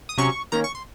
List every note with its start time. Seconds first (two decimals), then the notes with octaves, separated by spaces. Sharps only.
0.09 D#6
0.18 C3 F#3 C#4 C#6
0.52 D#3 A#3 C#4 A#5
0.64 C#6
0.75 C6